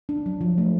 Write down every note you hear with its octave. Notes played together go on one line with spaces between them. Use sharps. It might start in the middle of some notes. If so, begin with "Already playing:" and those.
D4
F#3
F3
A3